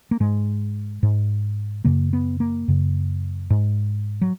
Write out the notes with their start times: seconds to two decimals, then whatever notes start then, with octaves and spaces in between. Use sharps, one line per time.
0.11 A#3
0.20 G#2 G#3
1.03 G#2
1.84 F#2 C#3 A#3
2.13 B3
2.40 A#3
2.68 F#2 C#3
3.50 G#2
4.21 F#3